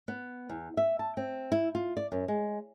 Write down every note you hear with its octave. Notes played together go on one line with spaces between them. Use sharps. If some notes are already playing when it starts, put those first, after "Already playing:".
B3
E2
E5
A5
C4
E4
F4
D5
F#2
G#3